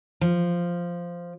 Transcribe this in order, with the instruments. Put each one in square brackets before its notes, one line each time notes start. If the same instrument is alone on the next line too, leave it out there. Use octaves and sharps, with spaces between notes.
[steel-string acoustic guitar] F3